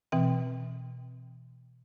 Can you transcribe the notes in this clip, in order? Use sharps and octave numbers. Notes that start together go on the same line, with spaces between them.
B2 E3 C4 G5